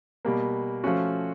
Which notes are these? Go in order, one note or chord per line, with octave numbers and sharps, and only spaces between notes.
B2 G3 A#3
F3 A3 C#4 F#4